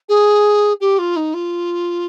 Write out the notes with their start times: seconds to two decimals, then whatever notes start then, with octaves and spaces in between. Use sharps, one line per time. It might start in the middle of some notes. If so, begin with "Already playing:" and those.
0.09 G#4
0.80 G4
0.98 F4
1.16 D#4
1.34 F4